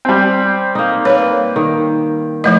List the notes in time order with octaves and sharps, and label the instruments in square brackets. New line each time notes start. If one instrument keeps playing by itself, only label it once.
[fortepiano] G3 C4
[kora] A#3 D#4
[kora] A#3 B4 [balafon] C#5
[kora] D#3
[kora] E3 [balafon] F3 A3 D#5